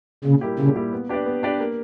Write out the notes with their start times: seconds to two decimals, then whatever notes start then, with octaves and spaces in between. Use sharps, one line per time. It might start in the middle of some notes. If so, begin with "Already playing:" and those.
0.24 A#2 C#3
0.41 G3 A#3 E4 G4
0.59 A#2 C#3
0.76 G3 A#3 E4 G4
0.93 B3
1.09 D4 G4 B4 D5
1.26 B3
1.43 D4 G4 B4 D5
1.60 A#3